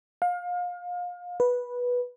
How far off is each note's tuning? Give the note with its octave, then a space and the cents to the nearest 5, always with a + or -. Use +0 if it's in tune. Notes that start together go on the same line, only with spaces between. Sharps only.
F5 +30
B4 -10